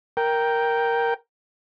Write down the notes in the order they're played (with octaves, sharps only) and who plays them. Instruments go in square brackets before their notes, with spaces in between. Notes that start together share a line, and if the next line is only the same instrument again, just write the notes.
[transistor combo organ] A#4 G5